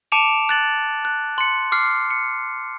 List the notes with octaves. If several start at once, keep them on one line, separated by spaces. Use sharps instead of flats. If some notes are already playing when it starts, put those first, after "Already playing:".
A5 D6 C#7 D7 E7 F7
F#6 A6 F#7
F#6
C6 C#7
D6 F6 C7
C#7